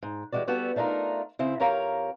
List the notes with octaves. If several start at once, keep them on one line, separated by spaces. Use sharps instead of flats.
G#2
E3 G3 G#3 F#4 D5
G3 B3 F#4 A4
A3 D4 D#4 F4 A#4
C#3 C4 E4
F2 G4 A#4 C#5 F5 A#5